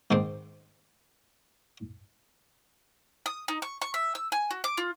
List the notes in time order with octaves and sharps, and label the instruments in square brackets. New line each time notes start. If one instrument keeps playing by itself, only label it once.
[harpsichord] G#2 D#3 C4 C5 D6
[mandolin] D#6
D#4
C#6
C#6
E5
E6
G#5
F#4
D6
F4